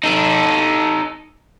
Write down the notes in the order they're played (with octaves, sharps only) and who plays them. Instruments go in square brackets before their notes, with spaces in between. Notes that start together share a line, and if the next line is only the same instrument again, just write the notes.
[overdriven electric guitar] D#4 A4